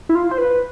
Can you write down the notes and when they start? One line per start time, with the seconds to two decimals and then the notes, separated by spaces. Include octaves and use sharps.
0.09 E4
0.15 F4
0.31 C5
0.38 B4